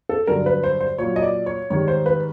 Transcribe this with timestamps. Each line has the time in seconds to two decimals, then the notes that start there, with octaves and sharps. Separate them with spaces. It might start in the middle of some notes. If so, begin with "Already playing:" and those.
0.09 A4
0.27 G2 D3 F#3 A#4
0.46 B4
0.64 C5
0.81 C5
0.98 A#2 F#3 C#5
1.16 D#5
1.22 D5
1.46 C#5
1.70 G#2 D#3 G3 C#5
1.88 C5
2.06 B4